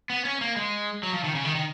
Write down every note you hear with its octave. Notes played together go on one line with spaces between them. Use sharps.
B3
C#4
A#3
G#3
F#3
F3
D#3
C#3
D#3
D#3